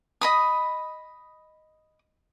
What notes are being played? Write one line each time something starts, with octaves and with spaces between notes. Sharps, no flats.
D#5 B5 D#6